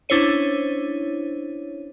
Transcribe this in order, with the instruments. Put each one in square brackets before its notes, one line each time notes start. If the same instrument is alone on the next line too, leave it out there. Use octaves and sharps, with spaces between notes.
[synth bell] C#4 D4 E4 C5 C#5 D#7